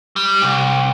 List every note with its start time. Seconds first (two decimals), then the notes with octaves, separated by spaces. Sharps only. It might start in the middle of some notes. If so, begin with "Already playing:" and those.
0.16 G3
0.42 C2